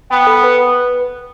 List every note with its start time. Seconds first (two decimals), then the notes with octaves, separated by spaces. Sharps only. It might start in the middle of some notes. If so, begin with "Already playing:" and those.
0.10 B3 G5
0.27 A4
0.44 B4